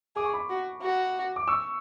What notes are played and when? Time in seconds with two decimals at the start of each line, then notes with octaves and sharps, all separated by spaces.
0.16 G#4 D6
0.25 C#6
0.34 B5 D6
0.50 F#4
0.82 F#4
1.36 D6
1.47 C#6 E6